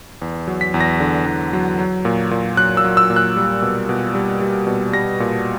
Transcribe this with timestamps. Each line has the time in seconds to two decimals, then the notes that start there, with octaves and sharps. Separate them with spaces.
0.22 E2
0.48 F#3
0.61 B6
0.74 E2
0.81 A#6
1.00 D3
1.26 E2
1.53 F#3
1.79 F#3
2.05 A#2
2.31 A#2
2.57 F#3 F#6
2.77 E6
2.84 F#3
2.97 E6
3.10 A#2
3.16 F#6
3.36 G3
3.62 B2
3.89 B2
4.15 G3
4.41 G3
4.67 B2
4.93 G3 A#6
5.20 A#2